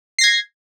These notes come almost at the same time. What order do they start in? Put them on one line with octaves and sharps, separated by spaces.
C7 A#6 G#6